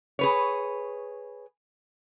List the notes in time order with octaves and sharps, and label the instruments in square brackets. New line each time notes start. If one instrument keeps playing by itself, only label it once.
[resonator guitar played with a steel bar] G#4 B4 C#5